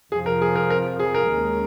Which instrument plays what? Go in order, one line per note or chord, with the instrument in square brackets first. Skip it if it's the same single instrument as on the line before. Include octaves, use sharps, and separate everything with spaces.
[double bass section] F2 C3 F3 [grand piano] G#4
[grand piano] A#4
G#4
A#4
A#4
G#4
A#4
[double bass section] D#2 D#3 G#3 C#4